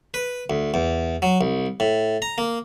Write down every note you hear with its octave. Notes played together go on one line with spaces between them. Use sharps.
B4
D2
E2
F#3
C2
A2
A#5
A#3